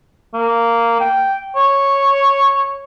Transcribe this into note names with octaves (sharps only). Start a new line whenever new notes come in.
A#3
G5
C#5